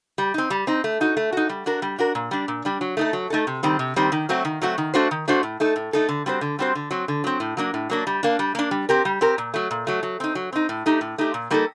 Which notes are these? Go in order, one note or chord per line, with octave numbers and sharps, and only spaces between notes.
G3
C4 D#4
G3
C4 D#4
A3
D#4 F#4
A3
D#4 F#4
G3
D4 F#4 A#4
G3
D4 F#4 A#4
A#2
G3 D4
A#2
G3 D4
F#3
A3 D#4 A4
F#3
A3 D#4 A4
C3
D#3 G3 C4
C3
D#3 G3 C4
D#3
F#3 A3 C4 F#4
D#3
F#3 A3 C4 F#4
D#3
A3 D4 F#4 C5
D#3
A3 D4 F#4 C5
A2
A3 D#4 A4
A2
A3 D#4 A4
D3
G3 C4 F#4 C5
D3
G3 C4 F#4 C5
D3
F#3 C4
D3
F#3 C4
A2
F#3 A#3 D4
A2
F#3 A#3 D4
G3
A#3 D4
G3
A#3 D4
G3
C4 G4 A#4
G3
C4 G4 A#4
A#2
F#3 A3
A#2
F#3 A3
F#3
C4 D#4
F#3
C4 D#4
A2
A3 D#4 G4
A2
A3 D#4 G4
A#2
G3 A#3 D#4 A4